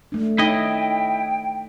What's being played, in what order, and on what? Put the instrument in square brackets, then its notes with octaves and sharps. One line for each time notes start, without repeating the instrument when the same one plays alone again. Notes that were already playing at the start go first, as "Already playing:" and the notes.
[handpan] A3 D4
[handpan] D#4 C#5 [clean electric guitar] E4 D#5 [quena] G5